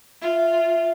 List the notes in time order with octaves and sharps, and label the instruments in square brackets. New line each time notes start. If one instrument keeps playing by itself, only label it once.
[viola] F4 [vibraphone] E5